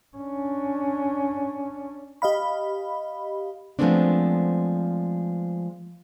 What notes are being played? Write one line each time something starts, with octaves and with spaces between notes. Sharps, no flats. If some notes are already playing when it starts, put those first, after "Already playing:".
C#4 D4
G4 D#5 F5 B5
F3 G#3 A3 B3 C4 D4